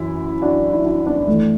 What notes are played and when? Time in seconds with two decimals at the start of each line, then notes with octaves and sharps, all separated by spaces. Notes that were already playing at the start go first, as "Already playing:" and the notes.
Already playing: F#2 E3 E4
0.42 D4 F#4
0.73 E4
0.85 D4 F#4
1.06 B3 D4
1.27 A2 E3 A3